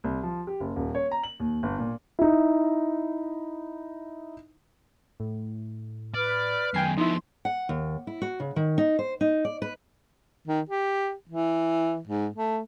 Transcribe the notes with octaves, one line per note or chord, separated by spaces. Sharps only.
C2
F3
G4
F#1
D#1
C#5
A#5
F#7
D#2
G1
A#2
D#4 E4
A2
B4 D5 F6
F#2 D#3 G5 G#5 C7
F3 B3 D#4 E4 C6
F#5
D#2
E4
F#4
C#3
D#3
D#4
C5
D#4
D5
B4
D#3
G4
E3
G#2
A3